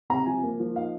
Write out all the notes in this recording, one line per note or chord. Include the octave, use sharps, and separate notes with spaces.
C3 A#5
F3 G#5
A#3
F3
D#4 F5